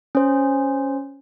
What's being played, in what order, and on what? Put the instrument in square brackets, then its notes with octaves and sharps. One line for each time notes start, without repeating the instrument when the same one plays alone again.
[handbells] C#4 C5